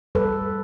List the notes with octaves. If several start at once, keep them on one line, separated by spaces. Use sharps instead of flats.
G3 A4 B4